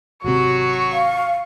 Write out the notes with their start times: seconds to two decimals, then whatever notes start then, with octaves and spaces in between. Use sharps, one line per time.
0.24 G#1 C3 F#3 F#4 C#6
0.92 F5